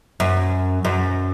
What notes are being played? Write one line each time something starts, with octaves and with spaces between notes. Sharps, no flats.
F#2
F#2